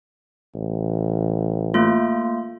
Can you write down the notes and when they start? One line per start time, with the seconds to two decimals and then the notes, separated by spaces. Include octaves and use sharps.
0.55 A1
1.74 A3 A#3 F4